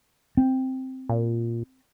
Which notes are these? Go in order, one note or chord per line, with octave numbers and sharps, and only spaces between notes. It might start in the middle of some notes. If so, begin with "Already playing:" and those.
C4
A#2